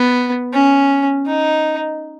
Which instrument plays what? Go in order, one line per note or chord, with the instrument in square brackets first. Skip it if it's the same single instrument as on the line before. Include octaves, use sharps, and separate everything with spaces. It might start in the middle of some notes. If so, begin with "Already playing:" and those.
Already playing: [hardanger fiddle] B3
C#4
D#4